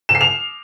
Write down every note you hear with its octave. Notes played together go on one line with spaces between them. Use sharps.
E7
C7
F7